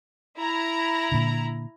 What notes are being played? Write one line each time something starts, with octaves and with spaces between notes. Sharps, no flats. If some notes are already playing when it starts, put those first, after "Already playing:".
E4 A#5
A#2 D3